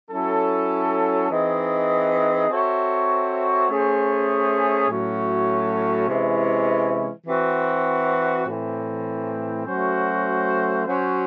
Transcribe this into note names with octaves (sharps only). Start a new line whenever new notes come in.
F#3 C#4 E4 A4
E3 C4 D#4 G#4 D#5
C4 F#4 A4 C#5 E5
A3 C#4 G#4 C5
A2 F#3 A3 C#4 F#4
C3 E3 G#3 C#4 E4
E3 C4 F#4
A2 E3 C4
F#3 A3 C#4 F#4 C5
F#3 C#4 F#4 C5